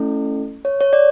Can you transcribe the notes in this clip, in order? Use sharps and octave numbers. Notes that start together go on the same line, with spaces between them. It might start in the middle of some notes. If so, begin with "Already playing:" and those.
Already playing: A3 C#4 E4 A4
C#5
C#5
D5